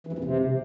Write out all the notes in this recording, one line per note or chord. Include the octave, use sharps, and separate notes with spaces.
E3
F2
A#2
C3